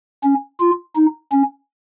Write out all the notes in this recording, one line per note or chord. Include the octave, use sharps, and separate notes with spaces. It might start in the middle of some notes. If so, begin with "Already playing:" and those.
C#4
F4
D#4
C#4